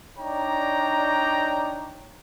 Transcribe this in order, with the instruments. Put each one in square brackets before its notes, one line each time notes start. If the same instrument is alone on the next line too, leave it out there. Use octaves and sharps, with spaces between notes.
[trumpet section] D4 D#4 C#5 D5 G5 A#5